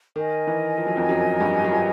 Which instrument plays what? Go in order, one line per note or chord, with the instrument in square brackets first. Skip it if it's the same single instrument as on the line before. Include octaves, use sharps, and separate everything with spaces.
[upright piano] D#3 [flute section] A#4 D#5 G#5
[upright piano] E3
F3
F#3
F2 F3
F#2 F#3
G2 G3
F#3
F3